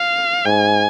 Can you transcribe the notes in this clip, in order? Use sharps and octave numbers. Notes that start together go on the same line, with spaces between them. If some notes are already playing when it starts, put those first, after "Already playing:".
Already playing: F5
G#2 G#5